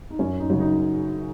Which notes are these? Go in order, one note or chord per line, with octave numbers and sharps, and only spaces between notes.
D#4
F#2 C#4
D#4
C#3 F#3
D#4